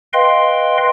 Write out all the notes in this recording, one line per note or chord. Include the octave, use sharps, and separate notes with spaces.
B4 D#5 F5 G5 C6